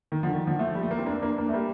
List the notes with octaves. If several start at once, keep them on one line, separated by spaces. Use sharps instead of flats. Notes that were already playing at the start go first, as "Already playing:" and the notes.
D#3
D3 F3
D#3
D3 F3
F3 A3
G3
A3
A#3
C4
A#3 D4
A#3 D4
A#3 D4
A3
G3 A#3